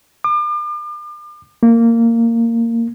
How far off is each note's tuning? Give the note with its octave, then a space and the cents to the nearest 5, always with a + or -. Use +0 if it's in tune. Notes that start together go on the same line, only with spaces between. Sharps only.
D6 +40
A#3 -15